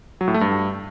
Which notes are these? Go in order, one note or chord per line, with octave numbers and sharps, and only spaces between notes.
F#3
A2
A3
G2